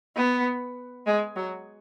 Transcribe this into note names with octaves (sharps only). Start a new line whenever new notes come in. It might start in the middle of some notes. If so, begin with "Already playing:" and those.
B3
G#3
F#3